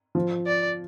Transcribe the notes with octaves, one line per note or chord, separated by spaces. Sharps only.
F3
D5